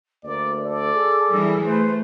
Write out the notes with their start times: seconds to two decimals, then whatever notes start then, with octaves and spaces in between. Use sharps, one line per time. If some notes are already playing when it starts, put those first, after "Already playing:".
0.24 D2 A#3 D5
0.63 A4 D5
0.95 G#4
1.30 E3 G3
1.65 A3 B4 C5